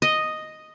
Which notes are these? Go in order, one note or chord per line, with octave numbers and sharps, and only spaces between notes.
D#5